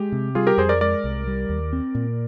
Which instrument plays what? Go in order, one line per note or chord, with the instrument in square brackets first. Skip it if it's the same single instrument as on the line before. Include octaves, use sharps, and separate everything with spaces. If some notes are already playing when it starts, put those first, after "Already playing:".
Already playing: [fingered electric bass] G#3 [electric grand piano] G4
[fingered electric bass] C3
[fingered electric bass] G3 [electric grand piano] F4 G#4
[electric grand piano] G4 A#4
[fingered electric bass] F2 [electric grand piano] G#4 C5
[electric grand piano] A#4 D5
[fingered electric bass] G#3 [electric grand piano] A#4 D5
[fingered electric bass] C2
G3
D#2
C4
A#2